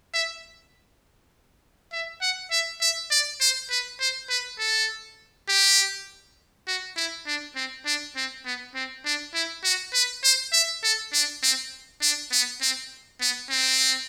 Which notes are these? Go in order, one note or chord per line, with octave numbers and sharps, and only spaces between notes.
E5
E5
F#5
E5
E5
D5
C5
B4
C5
B4
A4
G4
F#4
E4
D4
C4
D4
C4
B3
C4
D4
E4
F#4
B4
C5
E5
A4
D4
C4
D4
B3
C4
B3
C4